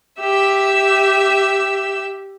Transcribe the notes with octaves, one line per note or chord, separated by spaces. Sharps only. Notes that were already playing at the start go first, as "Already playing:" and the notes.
G4 E5 E6